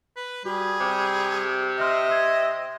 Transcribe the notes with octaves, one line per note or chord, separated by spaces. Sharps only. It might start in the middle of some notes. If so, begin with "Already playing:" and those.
B4
G3 F#4 G#4
C3 D6
D#5 E5 C6 F6 G6
C6 G6 G#6